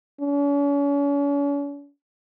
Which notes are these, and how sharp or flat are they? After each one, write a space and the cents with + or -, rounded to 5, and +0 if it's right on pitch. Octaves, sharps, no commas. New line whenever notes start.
C#4 +45